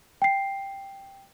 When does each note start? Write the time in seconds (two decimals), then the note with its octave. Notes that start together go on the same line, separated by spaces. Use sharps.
0.22 G5 C7